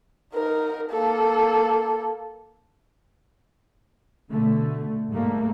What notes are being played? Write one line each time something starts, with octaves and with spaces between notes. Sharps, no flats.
D#4 A#4
A#3 A4
B2 D3 A3
G#2 G3 A3 A#3